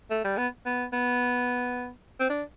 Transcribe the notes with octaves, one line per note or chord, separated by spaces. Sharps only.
A3
G3
B3
B3
B3
C4
D4